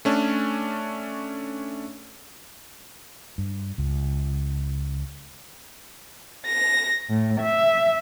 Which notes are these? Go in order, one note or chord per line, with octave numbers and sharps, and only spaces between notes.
A3 C#4 D4
G2
C#2
A#6
A2
E5